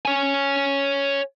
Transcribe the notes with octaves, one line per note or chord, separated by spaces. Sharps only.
C#5 G#5